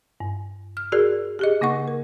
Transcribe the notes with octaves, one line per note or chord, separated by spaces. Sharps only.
G2
F6
F#4 G#4 A#4 D5
G4 G#4 D#5
C#3 A#3 D#4 F#5 C#6
A#4